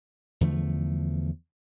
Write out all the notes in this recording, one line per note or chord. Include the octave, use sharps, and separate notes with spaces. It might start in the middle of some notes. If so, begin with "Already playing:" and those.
E2 D3 F3 A3